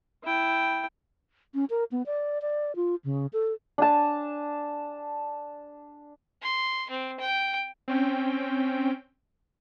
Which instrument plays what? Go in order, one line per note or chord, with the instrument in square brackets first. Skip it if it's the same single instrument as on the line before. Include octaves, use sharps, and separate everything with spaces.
[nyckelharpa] E4 G5
[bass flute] C#4
A#4
B3
D5
D5
F4
C#3
A4
[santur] D4 G#5 A5
[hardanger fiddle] C6
C4
G5
[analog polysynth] C4 C#4 G5